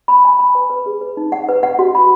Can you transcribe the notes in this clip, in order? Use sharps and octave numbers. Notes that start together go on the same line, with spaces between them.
B5
G#5
B5
B4
B4
G#4
B4
D#4
F#5
B4
F#5
F#4
B5